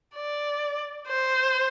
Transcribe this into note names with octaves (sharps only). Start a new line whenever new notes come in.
D5
C5